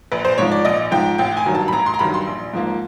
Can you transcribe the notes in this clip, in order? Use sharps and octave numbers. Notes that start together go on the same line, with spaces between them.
A#1 B4
C5
G#2 F3 C#5
D5
A#1 D#5
G#2 F3 G5
A1 G5
G#5
G2 D#3 F#3
A5
B5
A1 A#5
C6
A#5
G2 D#3 F#3 B5
C6
A#1
G#2 F3 A#3